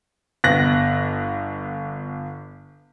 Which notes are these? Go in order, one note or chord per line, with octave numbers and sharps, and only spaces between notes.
G1 B3 F#6 A#6